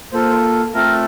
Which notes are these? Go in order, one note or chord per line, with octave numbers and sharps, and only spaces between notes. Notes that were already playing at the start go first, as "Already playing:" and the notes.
A#3 F4 A4 C5
A3 C4 F4 A4 A#4